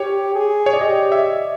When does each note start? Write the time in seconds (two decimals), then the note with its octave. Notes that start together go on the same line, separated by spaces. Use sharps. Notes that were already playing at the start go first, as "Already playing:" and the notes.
Already playing: G4 C#5
0.35 G#4
0.66 C#5
0.74 D5
0.81 G4 D#5
1.12 E5